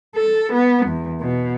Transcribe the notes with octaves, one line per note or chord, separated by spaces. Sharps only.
A4
B3
E2
B2